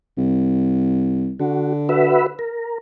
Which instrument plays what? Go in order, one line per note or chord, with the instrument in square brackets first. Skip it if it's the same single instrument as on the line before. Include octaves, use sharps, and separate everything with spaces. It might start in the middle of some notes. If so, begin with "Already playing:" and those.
[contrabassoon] C2
[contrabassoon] D3 [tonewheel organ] F#4
[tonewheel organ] F#4 B4 E5
A#4